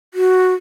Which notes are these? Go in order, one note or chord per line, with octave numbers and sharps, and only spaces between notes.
F#4